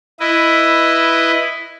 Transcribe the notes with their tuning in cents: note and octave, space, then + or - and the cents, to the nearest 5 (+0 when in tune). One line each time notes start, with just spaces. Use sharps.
E4 +5 B4 +0 D#5 +0